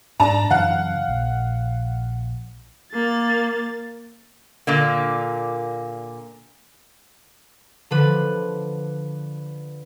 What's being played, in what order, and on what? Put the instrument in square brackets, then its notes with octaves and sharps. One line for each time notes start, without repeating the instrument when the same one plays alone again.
[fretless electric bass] G#2 [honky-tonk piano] D4 A5 A#5
[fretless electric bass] F#2 C#3 E3 [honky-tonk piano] F5 F#5
[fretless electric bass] A#1
[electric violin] A#3 A6
[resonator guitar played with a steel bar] A#2 D3 A#3
[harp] D3 F3 B4